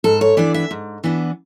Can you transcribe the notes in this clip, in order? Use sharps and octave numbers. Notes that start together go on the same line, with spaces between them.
G#2 A4
C#5
E3 B3 D4 D5
E5
G#2
E3 B3 D4